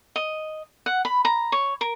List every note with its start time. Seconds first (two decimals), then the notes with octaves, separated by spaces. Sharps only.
0.16 D#5
0.86 F#5
1.05 B5
1.25 A#5
1.52 C#5
1.81 A#4